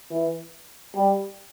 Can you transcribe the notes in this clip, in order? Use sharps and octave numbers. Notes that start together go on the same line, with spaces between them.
E3
G3